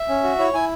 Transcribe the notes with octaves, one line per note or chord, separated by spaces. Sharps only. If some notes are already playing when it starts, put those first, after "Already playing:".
Already playing: E5
C#4
F#4
E4 C#5
E4 G#5